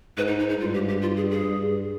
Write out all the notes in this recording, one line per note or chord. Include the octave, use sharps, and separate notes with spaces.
G#2 B4
D#4
D#4
D#4
G2 F4
G4
G4
F4
G#4
G#4
G2